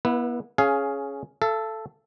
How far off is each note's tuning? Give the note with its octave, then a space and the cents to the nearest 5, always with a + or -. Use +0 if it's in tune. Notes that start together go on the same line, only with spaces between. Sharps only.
B3 -35 E4 +0 B4 +0
C#4 +0 G#4 +15 F5 +0
A4 +0 F5 -45